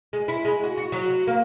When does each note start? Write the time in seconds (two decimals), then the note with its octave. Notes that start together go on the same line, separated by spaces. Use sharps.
0.13 G#3
0.28 E4
0.45 G#3
0.64 F#4
0.77 F#4
0.92 F#3
1.27 A#3